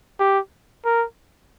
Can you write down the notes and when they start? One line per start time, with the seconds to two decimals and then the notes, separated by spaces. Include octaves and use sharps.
0.20 G4
0.85 A#4